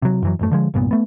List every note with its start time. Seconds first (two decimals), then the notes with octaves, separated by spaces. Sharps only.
0.02 C3 F#3
0.22 F#2 E3 F#3
0.39 A1 F#2 A3
0.51 D3 F3 G#3
0.74 C2 G2 A#2 B3
0.91 A3 B3